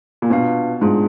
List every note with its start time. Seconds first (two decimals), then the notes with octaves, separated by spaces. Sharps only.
0.22 A#2
0.30 B2 D4 F4 B4 F5
0.81 G#2 D4 F4 G#4